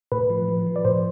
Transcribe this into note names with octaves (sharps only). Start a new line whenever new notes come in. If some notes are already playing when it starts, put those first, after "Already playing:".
A2 B4
F3
F3
F3
D5
A2 C5